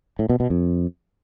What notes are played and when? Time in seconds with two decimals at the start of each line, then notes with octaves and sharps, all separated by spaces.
0.19 A2
0.30 B2
0.40 B2
0.50 F2